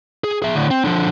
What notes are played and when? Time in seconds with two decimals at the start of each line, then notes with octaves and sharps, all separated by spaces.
0.24 G#4
0.42 G#4 E5
0.55 A2 D3
0.71 C4
0.84 D3 F3